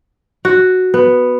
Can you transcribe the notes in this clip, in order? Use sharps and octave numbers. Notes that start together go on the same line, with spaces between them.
F#4
B3